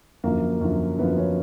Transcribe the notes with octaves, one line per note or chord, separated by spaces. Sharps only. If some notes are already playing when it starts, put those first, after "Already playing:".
F#2 D3 F3 A#3
F#2 D3 F3
F#2 D3 F3 B3
C#4